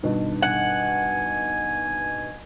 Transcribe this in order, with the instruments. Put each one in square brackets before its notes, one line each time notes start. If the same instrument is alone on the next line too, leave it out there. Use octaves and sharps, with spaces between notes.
[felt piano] G2 B2 D#3
[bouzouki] F#5 [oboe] G#5